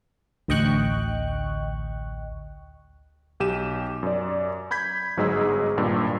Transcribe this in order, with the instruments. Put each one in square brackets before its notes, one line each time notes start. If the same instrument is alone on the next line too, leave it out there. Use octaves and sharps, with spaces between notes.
[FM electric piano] A1 D2 D#5 G5 C#6 F#6
[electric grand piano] B1 G4 D#7 E7
F#2 D5
B5 G6 G#6 B6
G1 G#2 F#3 G#4 D#5 E6
G#1 G2 A#2